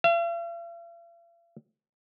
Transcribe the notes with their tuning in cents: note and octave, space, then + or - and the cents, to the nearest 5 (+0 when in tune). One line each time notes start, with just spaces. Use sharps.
F5 -45